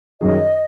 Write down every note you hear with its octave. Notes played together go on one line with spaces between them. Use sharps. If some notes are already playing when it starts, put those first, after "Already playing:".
F#2 D#3 F#3 C#4 G#4 D#5